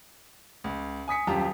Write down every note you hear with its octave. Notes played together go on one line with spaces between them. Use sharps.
C#2
G#5 D#6 B6 C#7
D#1 F#2 F4 G4 A5 A#5